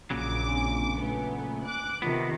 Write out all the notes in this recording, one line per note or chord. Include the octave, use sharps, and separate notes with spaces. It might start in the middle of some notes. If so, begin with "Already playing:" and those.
A#1 A#2 C#3 F#3 D6
C4 D4 G#5
A3 B3 G#5
D6 F#6
C3 D#3 B3 F4